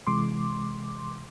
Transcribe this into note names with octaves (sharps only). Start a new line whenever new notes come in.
C3 E3 G#3 C6 D6